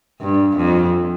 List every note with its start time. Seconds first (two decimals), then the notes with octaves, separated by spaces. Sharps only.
0.21 G2
0.56 F2